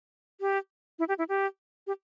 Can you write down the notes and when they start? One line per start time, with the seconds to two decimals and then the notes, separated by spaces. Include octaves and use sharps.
0.41 G4
0.99 E4
1.08 G4
1.18 E4
1.29 G4
1.87 G4